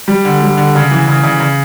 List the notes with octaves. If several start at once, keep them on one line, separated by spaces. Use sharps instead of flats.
G3
D3
G3
D3
C#3
E3
C#3
C#3
C#3